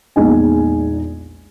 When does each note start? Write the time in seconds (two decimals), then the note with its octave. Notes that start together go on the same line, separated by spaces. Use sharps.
0.16 A#1 E2 G#3 D#4 D#5 G#5